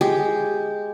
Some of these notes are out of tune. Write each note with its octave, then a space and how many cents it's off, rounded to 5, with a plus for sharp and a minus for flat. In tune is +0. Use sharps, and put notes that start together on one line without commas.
G#3 +0 G4 +0